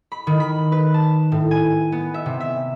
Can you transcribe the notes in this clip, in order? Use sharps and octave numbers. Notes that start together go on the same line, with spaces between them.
B5
D#3
B5
B4
A5
A2
G#5
B3
E5
C3
E5